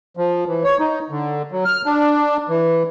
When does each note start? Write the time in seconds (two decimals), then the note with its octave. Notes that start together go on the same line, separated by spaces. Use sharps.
0.17 F3
0.48 E3
0.63 C#5
0.79 D#4
1.10 D3
1.52 F#3
1.65 F6
1.86 D4
2.49 E3